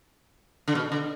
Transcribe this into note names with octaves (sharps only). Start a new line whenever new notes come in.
D3
B2
D3